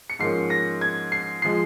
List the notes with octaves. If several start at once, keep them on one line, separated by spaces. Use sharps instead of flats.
C#7
G#2 F3 A#3 C#4 C7
A#6
G#6
C7
F3 G#3 C7